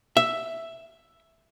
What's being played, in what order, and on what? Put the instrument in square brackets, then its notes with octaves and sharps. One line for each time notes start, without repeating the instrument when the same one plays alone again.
[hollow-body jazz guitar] E5